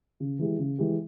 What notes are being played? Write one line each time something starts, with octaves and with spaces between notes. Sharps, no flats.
C#3
E3 G#3 E4 G4
C#3
E3 G#3 E4 G4